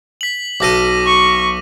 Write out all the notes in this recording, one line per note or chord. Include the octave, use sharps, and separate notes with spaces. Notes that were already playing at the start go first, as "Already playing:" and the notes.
B6 F#7
B1 A4 D6 A#6 D#7
C#6